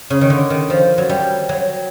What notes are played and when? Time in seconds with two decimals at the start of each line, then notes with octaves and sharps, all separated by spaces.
0.10 C#3
0.21 D#3
0.30 D3
0.50 D#3
0.70 F3
0.98 F#3
1.09 G3
1.49 F#3